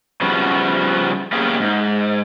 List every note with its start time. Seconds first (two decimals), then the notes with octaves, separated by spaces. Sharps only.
0.21 C#3 F3 G3 B3 F#4
1.33 A#3 B3 C#4 G4 G#4
1.60 G#2